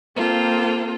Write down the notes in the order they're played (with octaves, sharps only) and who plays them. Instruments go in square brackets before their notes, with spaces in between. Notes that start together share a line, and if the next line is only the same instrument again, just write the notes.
[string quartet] A#3 C4 F4 A4